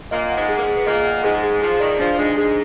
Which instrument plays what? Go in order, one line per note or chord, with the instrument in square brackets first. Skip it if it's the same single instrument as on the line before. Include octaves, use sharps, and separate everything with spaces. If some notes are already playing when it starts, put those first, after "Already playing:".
[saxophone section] A#2 A#3 [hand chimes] D#5
[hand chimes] F#5
[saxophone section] G#2 G#3
[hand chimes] G#4
[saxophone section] A#3
G#2 G#3
[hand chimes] G#4
[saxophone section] B3
[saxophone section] A#2 A#3 [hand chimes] D#5
[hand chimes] F#5
[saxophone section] G#2 G#3 [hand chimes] G#4
[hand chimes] G#4
[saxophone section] F3 [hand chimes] G#4
[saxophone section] D#3 [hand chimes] D5
[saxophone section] F3 [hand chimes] D4
[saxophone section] G#2 G#3 [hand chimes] D4
[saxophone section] G#2 G#3 [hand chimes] G#4